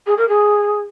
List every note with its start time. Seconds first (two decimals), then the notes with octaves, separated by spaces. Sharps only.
0.06 G#4
0.17 A#4
0.28 G#4